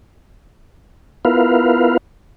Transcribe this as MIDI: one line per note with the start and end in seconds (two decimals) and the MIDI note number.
1.25 1.97 59
1.25 1.97 64
1.25 1.97 65
1.25 1.97 70
1.25 1.97 71
1.25 1.97 77